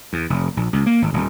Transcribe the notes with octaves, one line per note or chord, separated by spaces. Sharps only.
E2
F1
A#1
C#2
A#3
G#1
D#1